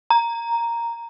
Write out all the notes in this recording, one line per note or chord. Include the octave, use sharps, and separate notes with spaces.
A#5